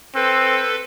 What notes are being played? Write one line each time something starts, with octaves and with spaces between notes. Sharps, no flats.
C4 A4 B4